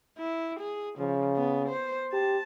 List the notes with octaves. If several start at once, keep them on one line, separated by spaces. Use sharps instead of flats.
E4
G#4
C#3 F3
B3
C5
G4 A5